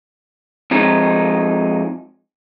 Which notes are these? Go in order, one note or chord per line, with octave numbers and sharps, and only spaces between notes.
F2 F3 G#3 D#4